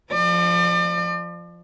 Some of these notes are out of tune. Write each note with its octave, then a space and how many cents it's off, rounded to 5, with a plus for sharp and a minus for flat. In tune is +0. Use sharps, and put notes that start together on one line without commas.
F3 +0 D5 +40